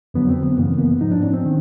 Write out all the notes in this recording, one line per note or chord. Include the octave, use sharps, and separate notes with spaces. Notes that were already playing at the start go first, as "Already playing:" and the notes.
F2 D3 F#3 B3
C4
B3
F#2 C#3 E3 A#3
B3
G#2 F3 D#4
D4
C#4
C4
D#3